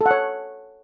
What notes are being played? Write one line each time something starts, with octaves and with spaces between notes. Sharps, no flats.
A4
F#5
C#5